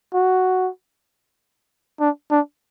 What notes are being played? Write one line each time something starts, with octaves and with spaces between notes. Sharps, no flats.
F#4
D4
D4